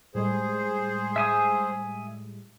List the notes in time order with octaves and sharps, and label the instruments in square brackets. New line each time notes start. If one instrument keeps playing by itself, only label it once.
[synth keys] A2 G3 G#3 [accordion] G#4 C5
[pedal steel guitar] E5 G#5 D#6